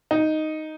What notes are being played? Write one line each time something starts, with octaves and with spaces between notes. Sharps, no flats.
D#4